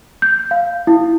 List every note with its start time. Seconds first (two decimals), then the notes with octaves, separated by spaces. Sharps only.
0.22 G6
0.51 F5
0.87 E4